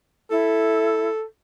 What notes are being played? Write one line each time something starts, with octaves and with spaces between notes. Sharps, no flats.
E4 A4